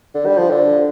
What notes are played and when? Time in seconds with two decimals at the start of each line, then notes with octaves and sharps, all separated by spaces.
0.15 D3
0.26 G3
0.37 F3
0.50 D3